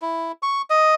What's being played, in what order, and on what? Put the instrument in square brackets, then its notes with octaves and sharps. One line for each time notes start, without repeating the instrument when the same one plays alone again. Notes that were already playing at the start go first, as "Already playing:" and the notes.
[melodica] E4
C#6
D#5